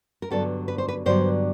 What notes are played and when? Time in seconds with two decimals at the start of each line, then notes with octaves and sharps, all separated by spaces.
0.22 A#4
0.30 G2 D3 F#3 B3 A4
0.68 B4
0.78 C5
0.89 B4
1.06 G2 D3 F#3 B3 C5